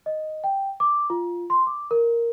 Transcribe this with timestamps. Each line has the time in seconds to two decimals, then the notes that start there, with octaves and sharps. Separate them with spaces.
0.06 D#5
0.44 G5
0.80 D6
1.10 F4
1.50 C6
1.67 D6
1.91 A#4